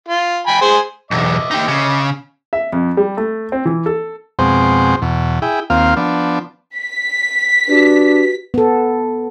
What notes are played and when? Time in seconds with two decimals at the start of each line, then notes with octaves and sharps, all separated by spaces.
0.09 F4
0.47 G5 G#5 B5
0.61 G#4 C5 G#5
1.11 B1 E2 D#5 E5 D6
1.51 D#4 G4
1.68 C#3
2.53 E5
2.73 F2
2.97 G3
3.17 A3
3.52 C4
3.65 E3
3.86 A4
4.39 F2 B2 G#3 C4 C5
5.02 E2 B2
5.42 E4 G#4 G5
5.70 D#2 A#3 C4 F4 F5
5.97 F3 B3 D4
6.79 B6
7.68 D4 F#4 G4 B4
8.54 B3 A4